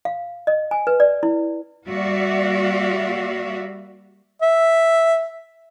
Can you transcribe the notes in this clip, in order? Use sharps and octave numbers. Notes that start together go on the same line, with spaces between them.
F5
D#5
G#5
B4
D5
E4
G3 A#3 F#4 D5 E5 F5
E5